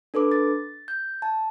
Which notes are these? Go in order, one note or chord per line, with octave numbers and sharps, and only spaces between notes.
D4 A4 B4 D6
A6
G6
A5